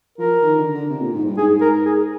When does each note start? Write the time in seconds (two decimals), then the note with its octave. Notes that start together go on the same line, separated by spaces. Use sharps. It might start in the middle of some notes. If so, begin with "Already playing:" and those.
0.18 F3 A#4
0.42 D#3
0.58 D3
0.74 D3
0.90 C3
1.02 A#2
1.13 G#2
1.25 G2
1.38 G#2 G#4
1.61 A#4
1.85 G#4